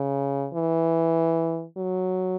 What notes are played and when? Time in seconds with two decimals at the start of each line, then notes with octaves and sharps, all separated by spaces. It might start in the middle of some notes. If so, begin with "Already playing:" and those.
Already playing: C#3
0.54 E3
1.78 F#3